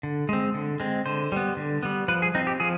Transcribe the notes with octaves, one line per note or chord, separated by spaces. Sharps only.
D3
G#3 C4
D3
G#3 C4
D3 C5
G3 B3
D3
G3 B3
F3 B4
G#4
C4 D#4
G4
F3 G#4